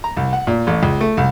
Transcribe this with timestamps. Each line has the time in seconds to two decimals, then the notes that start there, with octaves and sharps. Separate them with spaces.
0.04 A#5
0.17 C2
0.33 F#5
0.47 A#2
0.67 A1
0.83 C#2
1.01 A3
1.17 C2